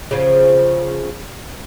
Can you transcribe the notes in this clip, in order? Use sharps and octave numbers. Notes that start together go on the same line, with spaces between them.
C#3 F3